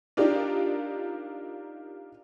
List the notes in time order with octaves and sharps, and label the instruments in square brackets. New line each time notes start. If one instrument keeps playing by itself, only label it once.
[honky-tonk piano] D4 D#4 F4 G4 A#4 D5